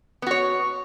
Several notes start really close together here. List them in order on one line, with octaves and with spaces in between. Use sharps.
B3 F#4 C#5